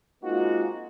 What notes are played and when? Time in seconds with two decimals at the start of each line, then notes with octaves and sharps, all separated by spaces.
0.23 G#3 A#3 C4 D#4 F4 F#4